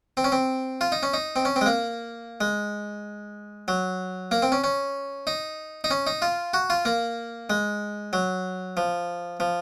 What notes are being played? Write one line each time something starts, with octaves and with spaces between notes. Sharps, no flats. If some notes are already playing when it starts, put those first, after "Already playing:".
C4
C#4
C4
F4
D#4
C#4
D#4
C4
C#4
C4
G#3
A#3
G#3
F#3
A#3
C4
C#4
C#4
D#4
D#4
C#4
D#4
F4
F#4
F4
A#3
G#3
F#3
F3
F3